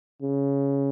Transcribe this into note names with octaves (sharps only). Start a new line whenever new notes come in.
C#3